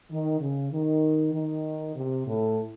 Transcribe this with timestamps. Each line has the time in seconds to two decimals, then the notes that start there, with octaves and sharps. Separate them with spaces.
0.10 D#3
0.40 C#3
0.71 D#3
1.33 D#3
1.95 C3
2.26 A2